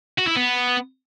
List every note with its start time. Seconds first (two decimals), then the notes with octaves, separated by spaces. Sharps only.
0.18 F#4
0.27 E4
0.36 B3